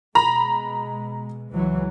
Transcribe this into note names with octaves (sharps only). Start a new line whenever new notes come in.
B2 G#3 A#5 B5
C#2 E3 F#3